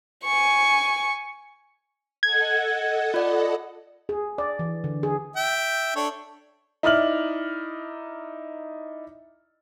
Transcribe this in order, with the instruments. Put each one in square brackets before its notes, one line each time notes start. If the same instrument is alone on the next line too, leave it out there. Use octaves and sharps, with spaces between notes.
[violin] G#5 C#6
[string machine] A4 D#5 F#5 [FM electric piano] G#6
[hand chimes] F4 D5
[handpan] G#4
D5
E3
D3
G#4
[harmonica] E5 G5
D4 A4 C#5
[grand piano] D#4 E4 D5 F6 F#7